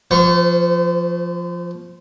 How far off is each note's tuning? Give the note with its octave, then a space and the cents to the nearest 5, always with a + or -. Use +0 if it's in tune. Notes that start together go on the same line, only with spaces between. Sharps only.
F3 +0 C5 -40 C#6 +0